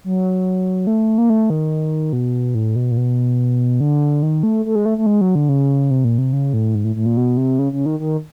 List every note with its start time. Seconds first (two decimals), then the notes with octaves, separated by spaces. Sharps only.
0.04 F#3
0.87 A3
1.18 A#3
1.30 A3
1.50 D#3
2.13 B2
2.55 A2
2.76 B2
2.91 A#2
2.97 B2
3.80 D3
4.22 D#3
4.43 A3
4.65 A3
4.75 G#3
4.86 A3
4.98 A3
5.06 G#3
5.21 F#3
5.35 D3
5.49 C#3
5.90 C3
6.04 A#2
6.18 C3
6.33 C#3
6.53 A2
6.75 G#2
6.84 A2
6.96 A2
7.06 A#2
7.17 B2
7.37 C3
7.59 C#3
7.73 C#3
7.86 D#3
8.00 D#3